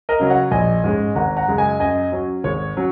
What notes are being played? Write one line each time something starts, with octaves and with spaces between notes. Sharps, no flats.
A#4 D#5
C#3 F#3 C#4
C#5 F#5
A#1 D#5 G#5
G#2 G#3 C#4
G#1 F#5 A#5
F#5 A#5
F#2 C#3 G#3
D#5 G#5
F#2 D#5 G#5
F#3 C#4
G#1 G#4 C#5
F#3 C#4